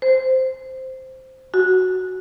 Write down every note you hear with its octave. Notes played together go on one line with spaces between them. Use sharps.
C5
F#4